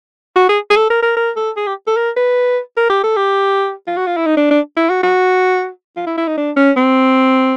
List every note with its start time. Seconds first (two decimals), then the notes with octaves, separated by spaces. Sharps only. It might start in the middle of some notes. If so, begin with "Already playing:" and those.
0.36 F#4
0.49 G#4
0.70 G#4
0.76 A4
0.90 A#4
1.03 A#4
1.17 A#4
1.36 A4
1.57 G#4
1.67 G4
1.87 A4
1.97 A#4
2.17 B4
2.77 A#4
2.90 G4
3.04 A4
3.16 G4
3.87 F4
3.97 F#4
4.07 F4
4.17 E4
4.26 D#4
4.37 D4
4.51 D4
4.77 E4
4.90 F#4
5.03 F#4
5.97 F4
6.07 E4
6.18 E4
6.28 D#4
6.37 D4
6.57 C#4
6.77 C4